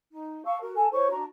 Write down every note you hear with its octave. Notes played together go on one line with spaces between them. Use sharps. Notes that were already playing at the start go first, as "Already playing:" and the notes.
D#4
F5 A5 C#6 E6
F#4 A#4
A4 G#5 A5
E4 C5 C#5 C#6
D4 F#4 A#5